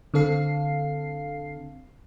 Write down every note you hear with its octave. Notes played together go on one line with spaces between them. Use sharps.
D3 C4 A4 F5 C7